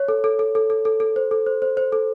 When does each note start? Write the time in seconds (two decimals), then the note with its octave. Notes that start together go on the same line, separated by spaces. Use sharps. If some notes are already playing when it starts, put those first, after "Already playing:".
Already playing: C#5
0.08 A4
0.24 A4
0.39 A4
0.55 A4
0.70 A4
0.85 A4
1.00 A4
1.16 C5
1.31 A4
1.46 C5
1.62 C5
1.77 C5
1.92 A4